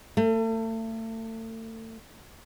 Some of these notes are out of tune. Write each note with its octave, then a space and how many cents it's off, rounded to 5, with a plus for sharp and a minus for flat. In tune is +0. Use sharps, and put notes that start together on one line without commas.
A3 +35